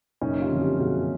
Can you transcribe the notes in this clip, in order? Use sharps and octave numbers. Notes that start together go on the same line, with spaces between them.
F#1 C#4 D#4
F4 G4
F2 D3
F4 G4
F#1 F#4 G#4